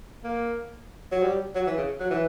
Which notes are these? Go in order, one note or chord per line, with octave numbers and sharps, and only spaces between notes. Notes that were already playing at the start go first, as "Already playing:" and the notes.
A#3
F#3
G3
F#3
E3
C#3
F#3
E3